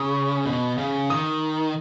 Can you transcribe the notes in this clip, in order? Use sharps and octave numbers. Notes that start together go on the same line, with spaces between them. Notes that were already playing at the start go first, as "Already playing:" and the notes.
Already playing: C#3 C#6 D#6
B2
C#3
D#3 D#6